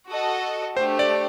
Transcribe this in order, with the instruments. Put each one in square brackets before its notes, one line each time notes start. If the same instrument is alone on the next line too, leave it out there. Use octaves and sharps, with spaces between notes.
[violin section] F#4 A4 D#5
[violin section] A3 D4 G4 [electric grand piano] C5
[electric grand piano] D5